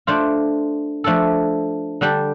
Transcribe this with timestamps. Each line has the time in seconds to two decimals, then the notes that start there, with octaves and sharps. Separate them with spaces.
0.07 A3 D4 F4 C5
1.04 F3 A3 D4 A4
2.01 D3 G3 D4 G4